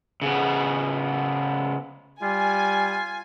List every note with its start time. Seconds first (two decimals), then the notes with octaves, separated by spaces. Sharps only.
0.22 C#3 B3
2.22 G3 F4 G#5